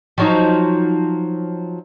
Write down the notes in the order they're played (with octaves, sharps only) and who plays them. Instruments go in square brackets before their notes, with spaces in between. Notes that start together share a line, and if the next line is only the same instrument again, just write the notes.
[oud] F3 F#3 D#4